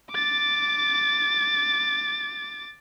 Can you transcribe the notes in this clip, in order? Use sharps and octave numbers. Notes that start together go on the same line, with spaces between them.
D6 A6